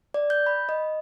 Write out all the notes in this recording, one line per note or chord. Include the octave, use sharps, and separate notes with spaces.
D5
G6
B5
D#5